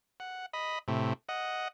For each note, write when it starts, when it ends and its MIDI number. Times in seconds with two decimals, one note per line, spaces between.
0.20 0.46 78
0.53 0.79 75
0.53 0.79 83
0.88 1.13 45
0.88 1.13 48
1.29 1.68 75
1.29 1.68 78